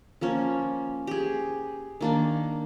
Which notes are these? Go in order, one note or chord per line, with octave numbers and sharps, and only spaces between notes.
F3 A#3 C#4
G4 G#4
D#3 A#3 D4